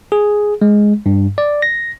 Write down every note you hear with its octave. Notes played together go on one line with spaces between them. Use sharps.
G#4
G#3
G2
D5
A#6